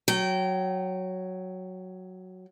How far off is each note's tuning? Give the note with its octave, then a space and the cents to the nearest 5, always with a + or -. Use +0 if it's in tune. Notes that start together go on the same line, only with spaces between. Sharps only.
F#3 +0 G5 -25